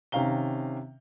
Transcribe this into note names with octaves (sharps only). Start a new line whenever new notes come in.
C3 D#3 C#4 F5 A#5 G7